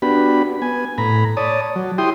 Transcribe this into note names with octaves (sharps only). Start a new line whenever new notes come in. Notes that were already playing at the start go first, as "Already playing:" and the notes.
B3 D4 F#4 G4 B5
B3 G#5
A2 A#5 B5
C#5 D5 A5 D#6
F#3
E4 G4 G5 C6 D#6